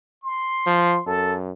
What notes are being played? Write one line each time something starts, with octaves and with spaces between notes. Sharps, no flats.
C6
F3
F#2 A4